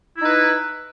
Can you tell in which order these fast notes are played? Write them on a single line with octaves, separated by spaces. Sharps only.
E4 D#4 B4